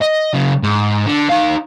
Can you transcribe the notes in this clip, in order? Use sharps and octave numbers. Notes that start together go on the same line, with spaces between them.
D#5
C#3 F#3
G#2
D3
D#4 F5